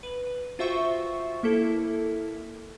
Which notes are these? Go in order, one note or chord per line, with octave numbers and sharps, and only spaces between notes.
B4
F4 F#4 C5 E5 G5 C#6
A#3 E4 A4